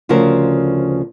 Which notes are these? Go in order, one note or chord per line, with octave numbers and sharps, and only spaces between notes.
D2 C#3 F3 F#4 A#4 C5